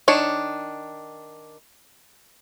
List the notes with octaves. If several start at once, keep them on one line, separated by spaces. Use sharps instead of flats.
D#3 D4 C#5